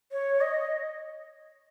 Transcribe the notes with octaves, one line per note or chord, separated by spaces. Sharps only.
C#5
D#5